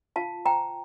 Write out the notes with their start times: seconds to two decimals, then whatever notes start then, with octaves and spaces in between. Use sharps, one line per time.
0.16 F4 F5 A5
0.46 C5 G5 A#5